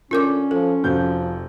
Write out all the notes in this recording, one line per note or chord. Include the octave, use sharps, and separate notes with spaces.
D3 C#4 F4 A#4 D6
F3 A4
F1 F3 F#4 G6